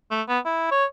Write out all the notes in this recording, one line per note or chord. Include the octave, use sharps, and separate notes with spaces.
A3
B3
E4
C#5